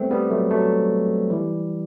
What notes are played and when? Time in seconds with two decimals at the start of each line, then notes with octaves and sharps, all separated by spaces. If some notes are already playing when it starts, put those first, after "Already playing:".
Already playing: G3 A3 B3 C4
0.11 G3 B3
0.30 F#3 A3
0.50 F#3 A3
1.30 E3 G3